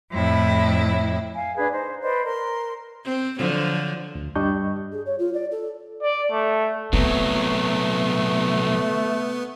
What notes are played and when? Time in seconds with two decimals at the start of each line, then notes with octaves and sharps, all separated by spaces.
0.12 F2 A2 E4
1.35 F5 G#5
1.57 D4 G#4 B4
1.71 D#4 C5
2.02 B4 C5 D5 D#5
2.25 A#4 C6
3.04 C4
3.36 D3 F3 F#3
4.15 D2
4.35 G2 G3 D4 D#5 C#6 G6
4.92 G#4
5.06 C#5
5.19 F4
5.33 D5
5.51 A4
6.02 D5
6.32 A3
6.93 C2 F#3 A3 B3 C4